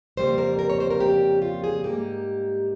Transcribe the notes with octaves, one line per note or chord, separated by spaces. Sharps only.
F2 C#3 G3 A#3 C5
A#4
A#4
C#5
C5
A#4
G4
F4
G#4
G#2 G3 A#3 G4